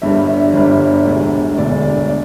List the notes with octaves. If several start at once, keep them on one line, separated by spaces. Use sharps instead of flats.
G1 G2 D3 G3 E5
E5
G1 G2 D3 G3
E1 D2 D3
E1 D2 D3 D5
D5